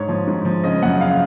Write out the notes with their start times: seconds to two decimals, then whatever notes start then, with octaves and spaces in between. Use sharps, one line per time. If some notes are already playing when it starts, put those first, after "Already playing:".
Already playing: G#2 C#5
0.09 F3
0.27 G#2
0.45 F3
0.64 C#3 D#5
0.82 F#2 F#5
1.01 C#3 F5